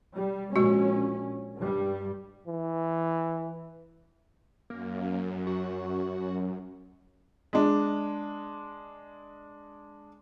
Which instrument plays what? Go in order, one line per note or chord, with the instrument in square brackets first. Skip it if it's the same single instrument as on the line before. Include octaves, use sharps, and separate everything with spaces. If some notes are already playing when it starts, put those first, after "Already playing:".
[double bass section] G3
[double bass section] A#1 C#4 [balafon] G#3 F#4
[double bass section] G2 G3
[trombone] E3
[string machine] F#2 [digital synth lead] A#3
[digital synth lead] F#4
[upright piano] G#3 D4